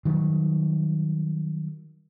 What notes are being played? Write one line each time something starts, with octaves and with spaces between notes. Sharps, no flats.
D#3 F#3 G3